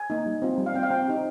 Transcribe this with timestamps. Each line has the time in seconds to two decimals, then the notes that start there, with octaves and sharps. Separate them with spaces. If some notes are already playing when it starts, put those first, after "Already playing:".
Already playing: G#5
0.10 A#3 D#4
0.26 G3
0.42 C4 F4
0.58 G3
0.66 F5
0.74 C4 G5
0.79 F4 F5
0.91 C4 G5
1.08 D#4 G4